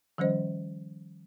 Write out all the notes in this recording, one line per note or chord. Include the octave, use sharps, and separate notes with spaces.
D#3 F3 G3 C#4 C5 D#5